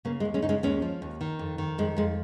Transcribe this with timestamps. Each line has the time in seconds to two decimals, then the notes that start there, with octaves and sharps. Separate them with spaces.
0.05 C#3 A#3
0.20 G#3
0.25 D#2
0.34 G#3 C#4
0.42 C#3 D#4
0.49 G#3 C#4
0.63 D#2 G#3 C#4
0.82 F3
1.02 D#2
1.21 D#3
1.39 F2
1.58 D#3
1.78 F2 G#3
1.96 F2 G#3